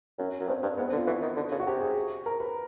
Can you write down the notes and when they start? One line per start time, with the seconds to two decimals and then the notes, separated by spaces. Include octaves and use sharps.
0.19 F#2 C#4
0.40 F#2
0.48 G2 C4
0.62 G2 C4
0.77 G#2 B3
0.87 C4
0.92 D3
0.97 F4
1.07 E3 F#4
1.22 D#3
1.36 D3
1.51 C#3
1.60 F#4
1.66 C3 G4
1.81 G#4
2.26 A#4
2.40 B4